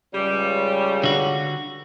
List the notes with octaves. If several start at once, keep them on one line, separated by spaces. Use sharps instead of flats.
C#2 C#3 G3
D3 F#4